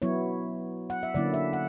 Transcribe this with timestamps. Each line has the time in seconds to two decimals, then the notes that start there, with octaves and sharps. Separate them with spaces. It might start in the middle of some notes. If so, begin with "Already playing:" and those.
0.02 F#3 B3 E4 C#5
0.90 F#5
1.03 E5
1.14 D3 F#3 A#3 C#4 E4 D5
1.34 E5
1.53 F#5